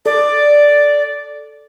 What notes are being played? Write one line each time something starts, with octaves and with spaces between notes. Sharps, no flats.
A4 D5